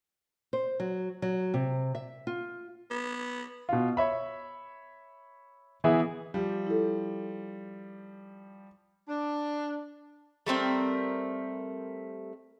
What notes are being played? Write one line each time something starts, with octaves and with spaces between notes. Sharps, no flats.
C5
F#3
F#3
C3
E5
F4
B3
B2 F4
C#5 E5 B5
E3 B3 E4 G#4 E5
F3 G3
E4 A4
D4
G3 A3 C4 A#4